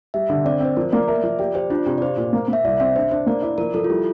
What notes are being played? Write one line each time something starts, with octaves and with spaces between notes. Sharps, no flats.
G3 E5
D3
C4 D5
C4 C5
F3 A#4
A#3 D5
D5
A#4 E5
F3
G4 D5
G4 C5
D4 F4
C3 G4
D5
F4 C5
A#2
A#3
A#3 E5
C2 D5
C4 E5
D4 C5
D4 C5
A#3 D5
E4 D5
F3 A#4
F3 A4
F4
G3 E4